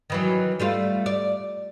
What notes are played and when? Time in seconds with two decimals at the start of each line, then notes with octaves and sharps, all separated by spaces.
0.10 D#3 E3 F#3
0.59 G3 A3 F4
1.06 D5